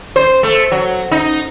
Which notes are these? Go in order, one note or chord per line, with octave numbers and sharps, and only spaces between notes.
C5
A3
F#3
D#4